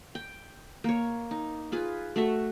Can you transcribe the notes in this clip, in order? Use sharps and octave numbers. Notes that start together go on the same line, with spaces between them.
G5
A#3 C#5
D#4
F4 G#4 B4
A3 F#4 E5